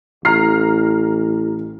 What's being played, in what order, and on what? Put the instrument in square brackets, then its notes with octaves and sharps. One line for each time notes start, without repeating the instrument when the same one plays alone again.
[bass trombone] A1 [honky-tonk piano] A#5 F6 C7